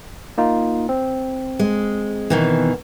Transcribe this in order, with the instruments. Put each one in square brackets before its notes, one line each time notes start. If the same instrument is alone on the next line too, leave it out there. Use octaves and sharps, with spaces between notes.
[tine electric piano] A#3 D#4 F4
C4
[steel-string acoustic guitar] G#3
B2 D#3 E3